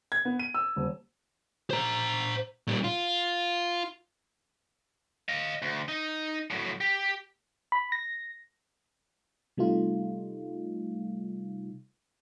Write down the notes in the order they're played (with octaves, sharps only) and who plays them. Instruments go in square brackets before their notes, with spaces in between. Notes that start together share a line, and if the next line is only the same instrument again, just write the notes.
[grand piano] G#6
B3
D#7
E6
D#1
[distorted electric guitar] C5 A#5
A#2 G3
F4
D#5 F5
D2
D#4
A2 F#3
G4
[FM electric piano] B5
A#6
C3 G3 A3 D#4 F4